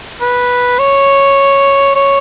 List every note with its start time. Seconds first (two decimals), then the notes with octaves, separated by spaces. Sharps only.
0.21 B4
0.79 C#5
1.96 C#5